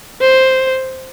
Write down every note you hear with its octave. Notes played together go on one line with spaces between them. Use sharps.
C5